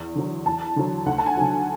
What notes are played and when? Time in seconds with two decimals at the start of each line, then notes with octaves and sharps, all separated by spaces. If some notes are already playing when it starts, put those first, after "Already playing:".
Already playing: E2
0.15 D3 F#3
0.46 E2 A5
0.76 D3 F#3
1.06 D2 F#5
1.18 A5
1.26 G#5
1.37 D3 F#3